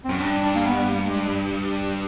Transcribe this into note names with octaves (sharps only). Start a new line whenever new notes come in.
C4
F#2 C#4
G2 D4
D4
A#3
B3
A#3
G#3
G3